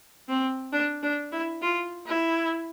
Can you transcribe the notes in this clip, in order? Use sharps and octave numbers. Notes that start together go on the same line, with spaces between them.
C4
D4
D4
E4
F4
E4